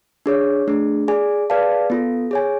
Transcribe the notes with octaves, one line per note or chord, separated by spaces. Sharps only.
D4 G#4 C#5
A3 D4 G#4
G#4 D5 G#5
G#4 B4 D5 F5 A5
B3 F4 A4
G#4 C#5 G#5